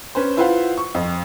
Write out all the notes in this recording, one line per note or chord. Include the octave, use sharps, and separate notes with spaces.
C#4 B4 C5
E4 F4 B4 C5 F5 F#5
C#6
F2